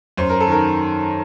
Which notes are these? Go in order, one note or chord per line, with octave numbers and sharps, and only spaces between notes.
F#2 C5
A#4
A4
D#3 A#4